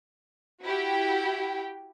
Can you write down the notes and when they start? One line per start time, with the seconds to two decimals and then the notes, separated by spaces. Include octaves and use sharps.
0.62 E4 F#4 G4 G5